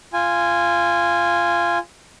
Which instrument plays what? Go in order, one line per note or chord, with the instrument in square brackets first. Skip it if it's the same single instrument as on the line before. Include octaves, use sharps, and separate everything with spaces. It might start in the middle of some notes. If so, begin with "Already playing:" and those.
[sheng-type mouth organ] F4 G#5